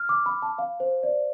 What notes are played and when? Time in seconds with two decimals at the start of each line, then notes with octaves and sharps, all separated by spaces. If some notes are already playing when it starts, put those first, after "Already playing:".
Already playing: F6
0.09 D6
0.26 B5
0.42 A5
0.58 F5
0.80 C5
1.03 D5